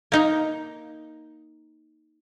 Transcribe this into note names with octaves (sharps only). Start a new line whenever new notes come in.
A#3 D#4 A#5